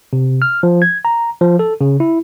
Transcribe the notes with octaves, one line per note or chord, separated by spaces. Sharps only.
C3
F6
F3
G#6
A#5
F3
A4
C#3
E4